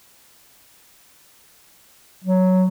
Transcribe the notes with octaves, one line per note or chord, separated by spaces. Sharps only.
F#3